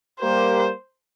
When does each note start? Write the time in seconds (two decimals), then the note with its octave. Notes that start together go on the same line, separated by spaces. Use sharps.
0.20 G3 A#3 G4 A#4 C5